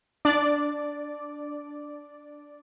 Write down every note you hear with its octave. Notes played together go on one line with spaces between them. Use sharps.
D4 D5